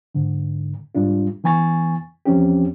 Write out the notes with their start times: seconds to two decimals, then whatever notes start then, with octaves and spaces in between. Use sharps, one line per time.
0.15 G#2 D3
0.95 G#2 G3 D4 F4
1.44 E3 B3 G#5 C#6 A6
2.25 E2 F3 C4 C#4 G4